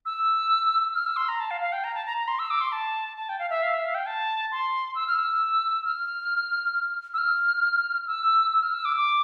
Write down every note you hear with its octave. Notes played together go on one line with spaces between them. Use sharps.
E6
F6
E6
C6
A#5
A5
F5
F5
G5
A#5
A5
A#5
A#5
C6
E6
D6
C6
A5
A5
G5
F5
E5
F5
E5
F5
G5
A5
C6
E6
F6
E6
F6
E6
F6
E6
E6
F6
E6
D6
D6